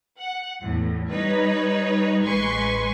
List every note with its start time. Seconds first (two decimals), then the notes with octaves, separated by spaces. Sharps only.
0.19 F#5
0.60 E2 A2
1.10 G3 D#4 B4 C#5
2.22 A1 G#3 B4 G#5 C6 C#6